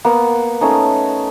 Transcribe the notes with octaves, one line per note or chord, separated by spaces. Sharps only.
A#3 B3 F#5
A3 C#4 D#4